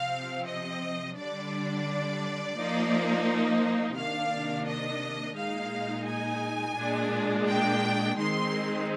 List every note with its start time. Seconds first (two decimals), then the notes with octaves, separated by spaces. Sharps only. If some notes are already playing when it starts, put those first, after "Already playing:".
Already playing: C3 F3 C4 F5
0.47 D#5
1.17 D3 G3 D4 D5
2.58 F3 A#3 D#4
3.97 C3 D#3 A#3 D4 F5
4.68 D#5
5.37 A#2 G#3 D#4 F5
6.07 G#5
6.77 A#2 G#3 D4
7.48 G5
8.18 D#3 G#3 C4 D#4 C6